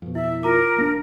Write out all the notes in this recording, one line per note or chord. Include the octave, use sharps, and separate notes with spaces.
F2 B2
E4 E5
F4 A#4 A#5 D6
D#1 A#3 D4